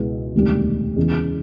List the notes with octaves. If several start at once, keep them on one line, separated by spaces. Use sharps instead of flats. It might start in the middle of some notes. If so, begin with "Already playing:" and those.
Already playing: C#2 B2 G#3 B3 E4
E1 D2 C3 D#3 G3
E2 C#3 E3 G#3